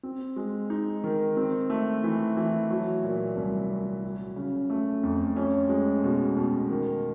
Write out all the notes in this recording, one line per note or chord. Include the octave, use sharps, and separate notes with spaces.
C4
G#3
D#4
D#3
C4
A3
E3
E3
F#3
A#2
C2
C2
F#3
C#3
A3
F2
C#4
G#3
B2
B2
D#3